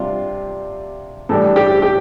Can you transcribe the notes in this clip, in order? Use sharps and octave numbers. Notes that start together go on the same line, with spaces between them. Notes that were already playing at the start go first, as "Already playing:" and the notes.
Already playing: C3 G3 D4 F4
A2 E3 G3 D4 A4
G4
G4